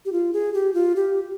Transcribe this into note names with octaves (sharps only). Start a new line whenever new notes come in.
G4
F4
G#4
G4
F4
G4